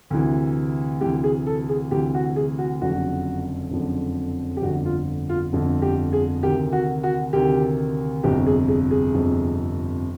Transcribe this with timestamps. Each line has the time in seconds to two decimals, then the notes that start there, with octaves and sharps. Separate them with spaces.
0.10 D2 C3 E3
1.01 D2 C3 E3 G4
1.24 G#4
1.47 A4
1.69 G#4
1.91 D2 C3 E3 G4
2.14 F#4
2.36 G#4
2.58 F#4
2.81 F#1 F2 D3 F#4
3.71 F#1 F2 D3
4.57 G4
4.62 G1 F2 D3 F#4
4.85 F4
5.29 F4
5.53 G1 F2 D3
5.82 G4
6.13 G#4
6.43 D2 C3 D#3 G4
6.72 F#4
7.03 F#4
7.33 D2 C3 D#3 G4
8.23 G1 F2 C3 G4
8.46 G#4
8.68 G#4
8.91 G#4
9.14 G1 F2 C3